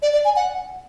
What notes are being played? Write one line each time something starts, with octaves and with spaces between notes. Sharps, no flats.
D5
D5
G#5
F#5